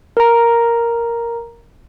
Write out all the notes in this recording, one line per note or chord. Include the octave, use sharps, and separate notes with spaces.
A#4 A#5